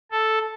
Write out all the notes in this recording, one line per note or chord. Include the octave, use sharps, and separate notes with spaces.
A4